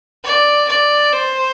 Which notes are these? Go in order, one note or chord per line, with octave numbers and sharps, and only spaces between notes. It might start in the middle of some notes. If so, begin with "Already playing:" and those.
D5
D5
C5